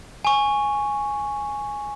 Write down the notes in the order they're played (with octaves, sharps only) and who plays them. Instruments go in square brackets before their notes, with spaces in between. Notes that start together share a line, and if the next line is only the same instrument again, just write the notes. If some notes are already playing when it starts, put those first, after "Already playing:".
[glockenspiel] G#5 C#6